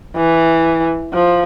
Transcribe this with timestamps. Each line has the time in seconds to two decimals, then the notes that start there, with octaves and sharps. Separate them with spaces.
0.16 E3
1.14 F3